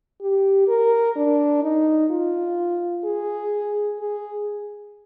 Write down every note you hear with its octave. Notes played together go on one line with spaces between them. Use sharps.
G4
A#4
D4
D#4
F4
G#4
G#4